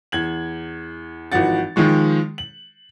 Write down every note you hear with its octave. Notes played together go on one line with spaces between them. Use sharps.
E2 G#6 F#7
G#1 E3 F3 F#4 F#5 A6
D#3 F3 G#3 C#6
F#7